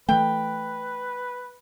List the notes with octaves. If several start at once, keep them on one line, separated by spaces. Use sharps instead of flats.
E3 A3 B4 G5